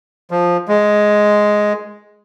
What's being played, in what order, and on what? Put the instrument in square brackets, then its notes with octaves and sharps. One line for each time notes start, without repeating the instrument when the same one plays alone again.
[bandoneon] F3
G#3